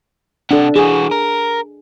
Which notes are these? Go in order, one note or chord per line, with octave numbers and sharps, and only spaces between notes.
C3 D4 A4 F#5
E3 F#4 G#4
A#4